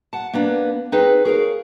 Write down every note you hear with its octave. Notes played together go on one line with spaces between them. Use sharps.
F#5 A5
A#3 B3 D4
C4 D#4 G#4 B4
G#4 A#4 C#5 F5